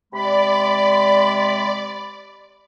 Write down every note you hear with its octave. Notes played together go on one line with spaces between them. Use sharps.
C3 G#3 D5 B5